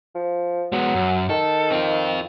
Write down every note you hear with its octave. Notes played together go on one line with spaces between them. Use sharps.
F3
F#3 G#3 B3
F#2
D#3 A4
C4 F4